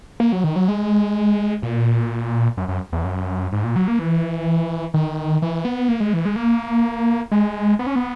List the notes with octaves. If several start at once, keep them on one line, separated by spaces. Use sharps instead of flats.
A#3
F#3
D#3
F#3
G#3
A#2
F#2
F#2
E2
F#2
G#2
A#2
F#3
A#3
E3
D#3
E3
B3
A#3
G#3
E3
G#3
A#3
G#3
B3
C#4
B3